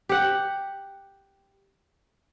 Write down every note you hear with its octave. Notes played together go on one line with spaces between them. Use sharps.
G4 F#5